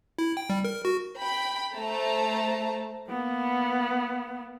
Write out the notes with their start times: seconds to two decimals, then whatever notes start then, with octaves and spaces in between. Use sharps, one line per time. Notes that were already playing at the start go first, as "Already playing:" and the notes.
0.19 E4
0.37 G5
0.50 G3
0.64 A#4
0.85 F#4
1.20 G5 B5
1.75 A3 C5 A5 A#5
3.09 A#3 B3